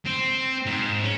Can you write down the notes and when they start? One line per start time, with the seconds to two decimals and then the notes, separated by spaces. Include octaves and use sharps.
0.06 C4
0.66 G#2
1.04 C#4